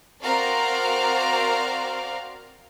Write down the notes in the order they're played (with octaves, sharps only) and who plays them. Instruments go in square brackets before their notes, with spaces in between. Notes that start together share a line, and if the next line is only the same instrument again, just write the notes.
[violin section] C4 F#4 A#4 D5 F5 A#5